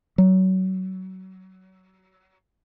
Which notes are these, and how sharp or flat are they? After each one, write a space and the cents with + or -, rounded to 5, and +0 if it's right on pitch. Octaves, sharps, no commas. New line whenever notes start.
F#3 +25